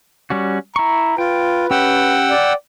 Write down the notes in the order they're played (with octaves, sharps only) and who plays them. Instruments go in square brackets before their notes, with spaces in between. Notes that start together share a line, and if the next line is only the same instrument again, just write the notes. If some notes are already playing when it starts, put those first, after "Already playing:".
[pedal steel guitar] G3 C#4 F#4
[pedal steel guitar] E4 C#6 [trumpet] A#5
[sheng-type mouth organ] F4 [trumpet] B4 [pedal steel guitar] G5
[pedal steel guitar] C#4 G4 [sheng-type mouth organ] F#5 G5 E6
[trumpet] D5